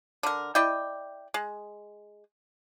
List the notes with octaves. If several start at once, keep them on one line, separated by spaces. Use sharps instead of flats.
D3 A#4
E4 D5 D#5 G5
G#3